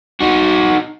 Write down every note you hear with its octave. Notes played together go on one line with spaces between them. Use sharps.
D#4 F#4